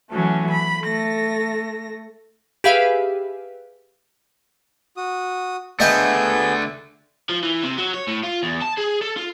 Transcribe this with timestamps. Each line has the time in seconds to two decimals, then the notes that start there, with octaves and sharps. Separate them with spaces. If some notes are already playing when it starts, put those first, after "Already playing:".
0.11 E3 F#3 A3 C#4
0.51 B5
0.83 A3 A#6
2.64 G4 G#4 B4 E5 F5
4.97 F#4 D#6
5.80 D3 A3 B3 G#4 D#5 E5 G5 G6
7.29 F3
7.43 E3
7.63 C3
7.78 F#3
7.94 C#5
8.08 A2
8.24 F4
8.43 E2
8.61 A5
8.77 G#4
9.02 A4
9.17 F4